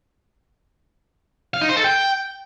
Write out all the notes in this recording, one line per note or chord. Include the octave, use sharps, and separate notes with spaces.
F5
D#4
C5
A4
G5